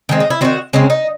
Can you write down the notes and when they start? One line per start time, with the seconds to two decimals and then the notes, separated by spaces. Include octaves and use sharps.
0.09 D#3 G#3 C4
0.20 D#4
0.30 E4
0.41 F#3 C4 F#4
0.45 D#3
0.73 C#3 G#3 C4 C#4
0.90 D#4